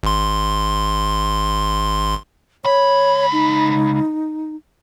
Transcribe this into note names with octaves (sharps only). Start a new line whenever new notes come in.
G#1 C6
C#2 C#5 B5
D#4